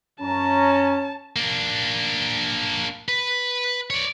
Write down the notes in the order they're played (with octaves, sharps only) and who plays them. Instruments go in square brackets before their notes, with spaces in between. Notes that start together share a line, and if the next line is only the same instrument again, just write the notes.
[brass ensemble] F#2 A#5 [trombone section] C#4 [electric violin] A5
[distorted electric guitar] A#3 D4
B4
C#5 D5